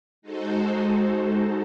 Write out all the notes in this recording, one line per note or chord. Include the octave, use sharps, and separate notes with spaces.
G#3 D#4 F#4 A4 C5